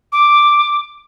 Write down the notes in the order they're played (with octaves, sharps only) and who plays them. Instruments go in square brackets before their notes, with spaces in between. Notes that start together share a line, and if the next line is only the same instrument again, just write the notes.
[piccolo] D6